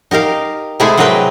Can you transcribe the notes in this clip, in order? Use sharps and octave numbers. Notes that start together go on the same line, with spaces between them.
D#4 G4 A#4 F5
C3 G#3 A3 E4 G#4 F5
C3 F#3 G#4 A#4 B4 G5